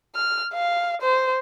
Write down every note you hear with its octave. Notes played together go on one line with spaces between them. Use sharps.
F6
F5
C5